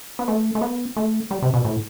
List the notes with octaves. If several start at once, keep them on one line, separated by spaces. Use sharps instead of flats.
B3
A3
A3
B3
A3
G3
C3
B2
A2